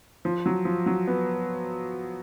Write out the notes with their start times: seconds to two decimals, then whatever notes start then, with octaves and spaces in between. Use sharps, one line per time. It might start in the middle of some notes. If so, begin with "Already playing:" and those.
0.25 F3
0.46 F#3
0.65 F3
0.86 F#3
1.07 B3